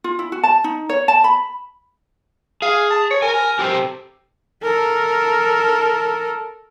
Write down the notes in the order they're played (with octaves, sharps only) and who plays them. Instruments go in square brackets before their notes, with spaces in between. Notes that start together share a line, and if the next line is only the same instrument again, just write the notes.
[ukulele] F4
E4
F#4
A5
D#4
C#5
A5
B5
[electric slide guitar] G#4 [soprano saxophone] F5
[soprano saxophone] A5
C#5
[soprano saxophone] A#4 [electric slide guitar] G#5
[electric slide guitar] G4 A4 C5
[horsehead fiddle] A4 A#4